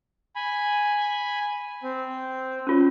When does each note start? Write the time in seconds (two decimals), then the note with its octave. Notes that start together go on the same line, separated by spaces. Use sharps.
0.36 G#5 B5
1.83 C4
2.67 C#4 F4 C#5